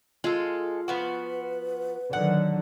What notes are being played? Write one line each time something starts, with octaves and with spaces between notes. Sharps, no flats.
G#3 F4 A4
F3 B3 F#4 B4
D3 D#3 F#3 F#5